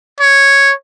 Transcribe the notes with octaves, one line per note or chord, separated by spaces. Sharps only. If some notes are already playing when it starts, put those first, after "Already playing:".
C#5